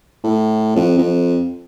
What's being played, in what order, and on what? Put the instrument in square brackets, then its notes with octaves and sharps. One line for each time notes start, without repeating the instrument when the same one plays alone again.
[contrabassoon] A2
F2
F2